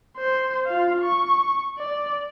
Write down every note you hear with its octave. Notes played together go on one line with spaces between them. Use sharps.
C5
F4 F5
C#6
D5